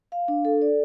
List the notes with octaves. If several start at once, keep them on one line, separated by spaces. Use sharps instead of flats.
F5
D4
A4
D5